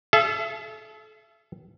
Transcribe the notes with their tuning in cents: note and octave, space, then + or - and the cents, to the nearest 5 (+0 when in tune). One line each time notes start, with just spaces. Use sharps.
A4 -35 E5 +40